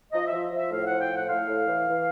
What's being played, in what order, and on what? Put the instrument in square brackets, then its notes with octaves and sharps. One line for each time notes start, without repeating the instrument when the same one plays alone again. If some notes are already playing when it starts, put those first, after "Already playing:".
[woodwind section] F3 D#5
E5
F3
F3
E5
A2 F5
F3 F#5
G5
A2
F#5
A2 F5
A2
E3
E3